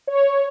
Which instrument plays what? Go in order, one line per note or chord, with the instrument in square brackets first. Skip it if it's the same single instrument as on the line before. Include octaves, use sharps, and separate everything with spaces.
[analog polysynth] C#5